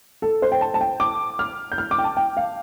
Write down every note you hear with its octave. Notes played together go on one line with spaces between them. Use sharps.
A4
C5
G5
A5
A5
G5
D6
F6
G6
F6
D6
G5
A5
G5
F5